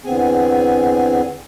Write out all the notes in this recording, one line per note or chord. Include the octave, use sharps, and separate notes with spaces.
E2 D3 B3 C4 G#4 G#5